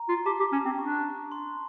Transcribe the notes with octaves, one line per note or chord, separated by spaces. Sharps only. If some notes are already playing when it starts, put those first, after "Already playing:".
Already playing: A#5
F4
G4 A5
G4
C#4 A5
C4
D4 C#6
C6